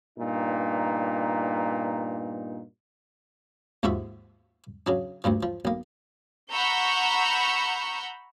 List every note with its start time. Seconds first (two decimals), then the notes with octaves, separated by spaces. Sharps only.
0.18 G2 A#2 B3 D#4
3.83 D#2 G#2 C3 F3 F#4 E5
4.87 C#3 F#3 D4
5.24 D2 G2 A#2 F3
5.43 F3
5.65 B1 A#3
6.52 F#5 A#5 B5 C#6 E6 G6